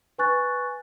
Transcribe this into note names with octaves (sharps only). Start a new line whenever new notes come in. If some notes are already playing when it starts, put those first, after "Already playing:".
B4 G#5 C#6 F#6 A6